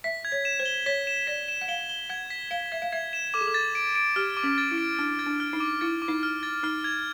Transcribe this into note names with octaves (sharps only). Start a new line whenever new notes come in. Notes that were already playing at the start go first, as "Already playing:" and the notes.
E5 B6
G#6
C#5
E7
C5
G7
C#5 B6
E7
D5 B6
E7
F#5
F5 G7
G7
F#5 G#6
B6
F5 G7
E5 G#6
F5
E5 G#6
E7
A4 D6
G#4
A4
A6
D7
D7
G4 F6
D6
C#4
A6
E4
D7
D4 F6
A6
D4
F6
D#4
D6
E4 A6
D6
D#4
F6
A6
D#4 F6
G#6